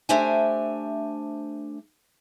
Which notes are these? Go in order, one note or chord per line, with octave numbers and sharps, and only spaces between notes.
A3 D4 G4 C5 E5 G#5